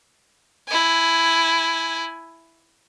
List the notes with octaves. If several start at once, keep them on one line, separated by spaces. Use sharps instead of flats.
E4 G#5